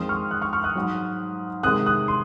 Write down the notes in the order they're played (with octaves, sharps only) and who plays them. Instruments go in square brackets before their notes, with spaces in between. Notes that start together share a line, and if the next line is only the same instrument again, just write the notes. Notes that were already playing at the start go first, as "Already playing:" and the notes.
Already playing: [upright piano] F2 D#3 G#3 C6 D#6
C#6 F6
D#6 F#6
C#6 F6
C#6 F6
D#6 F#6
G#2 F#3
C3 D#3 G#3 D#6 F#6
D#6 F#6
C6 D#6